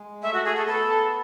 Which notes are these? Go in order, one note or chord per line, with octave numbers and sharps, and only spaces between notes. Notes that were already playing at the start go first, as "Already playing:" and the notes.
Already playing: G#3
A3 E5
F#4
G#4
A4
B3 A4